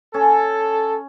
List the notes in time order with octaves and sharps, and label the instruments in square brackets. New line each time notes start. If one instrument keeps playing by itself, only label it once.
[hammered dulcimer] C#4 [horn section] A4